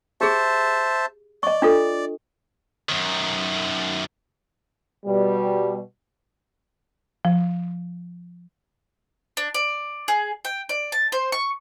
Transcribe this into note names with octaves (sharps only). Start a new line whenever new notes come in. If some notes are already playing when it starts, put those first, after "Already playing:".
G4 G#4 C5 E5 A5
D5 D#5 C#6
D4 F4 A4
F#2 D#3
B2 G3
F3
D4
D5
G#4
G5
D5
A5
C5
C#6